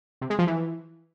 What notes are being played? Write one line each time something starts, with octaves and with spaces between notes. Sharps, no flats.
C3
G#3
F3
E3